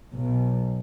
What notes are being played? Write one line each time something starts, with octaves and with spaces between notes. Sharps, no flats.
B1